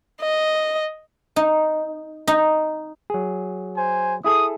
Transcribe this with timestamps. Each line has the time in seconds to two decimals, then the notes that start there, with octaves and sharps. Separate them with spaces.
0.21 D#5
1.36 D#4
2.28 D#4
3.10 F#3 G#4
3.76 C5 G#5
4.24 E4 G#4 A4 D#6